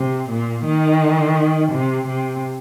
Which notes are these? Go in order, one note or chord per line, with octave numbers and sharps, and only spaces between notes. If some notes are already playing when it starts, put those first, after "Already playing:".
Already playing: C3
A#2
D#3
C3
C3